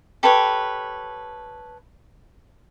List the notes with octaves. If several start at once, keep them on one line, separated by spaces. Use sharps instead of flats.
G4 A4 B4 C#5